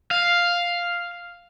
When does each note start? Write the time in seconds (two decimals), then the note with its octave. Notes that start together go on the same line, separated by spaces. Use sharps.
0.11 F5